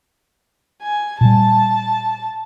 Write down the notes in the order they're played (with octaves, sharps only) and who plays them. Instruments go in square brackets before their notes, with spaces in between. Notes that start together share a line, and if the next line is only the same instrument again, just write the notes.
[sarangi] G#5
[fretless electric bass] A#2 G3 [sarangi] A5